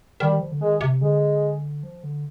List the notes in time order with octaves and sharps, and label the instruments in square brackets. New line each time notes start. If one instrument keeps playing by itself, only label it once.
[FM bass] D#3 [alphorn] G3
[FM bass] F3
D3
[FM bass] D#3 [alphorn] G#3
[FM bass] C3
[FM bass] D3 [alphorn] G#3
[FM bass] F3
D3